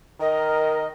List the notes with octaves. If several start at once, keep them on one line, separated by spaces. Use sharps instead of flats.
D#3 A#4 D#5